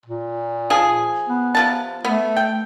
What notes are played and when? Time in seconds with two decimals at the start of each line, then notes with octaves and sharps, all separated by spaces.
0.06 A#2
0.70 F3 G#4
1.29 B3
1.55 C3 F3 A5
2.05 A3 B3
2.36 G5